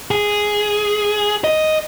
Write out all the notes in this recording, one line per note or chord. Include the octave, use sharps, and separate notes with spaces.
G#4
D#5